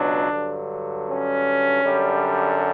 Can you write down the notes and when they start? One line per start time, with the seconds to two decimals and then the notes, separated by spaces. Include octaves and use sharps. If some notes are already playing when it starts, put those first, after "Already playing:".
Already playing: C#2 B2 F#3 D4
0.31 G2 D3 F#3
1.07 C#4
1.84 F#2 D3 G3